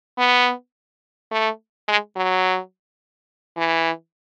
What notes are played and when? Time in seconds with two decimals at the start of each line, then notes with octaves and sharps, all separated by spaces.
0.18 B3
1.32 A3
1.88 G#3
2.16 F#3
3.57 E3